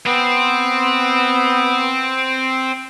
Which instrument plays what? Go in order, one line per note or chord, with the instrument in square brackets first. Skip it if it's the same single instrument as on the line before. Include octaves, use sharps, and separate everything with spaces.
[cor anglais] B3 [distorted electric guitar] C4